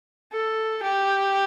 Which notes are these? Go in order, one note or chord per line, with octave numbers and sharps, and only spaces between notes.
A4
G4